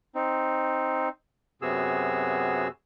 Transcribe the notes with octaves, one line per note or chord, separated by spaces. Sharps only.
C4 D#4
F#2 C3 B3 F#4 G#4 E6